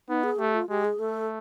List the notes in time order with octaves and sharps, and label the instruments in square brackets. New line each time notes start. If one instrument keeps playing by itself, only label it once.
[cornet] B3 [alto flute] D#4
[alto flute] G#4
[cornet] A3 [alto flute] G4
[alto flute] F4
[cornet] G#3 [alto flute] G4
[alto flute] G#4
[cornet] A3 [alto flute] A4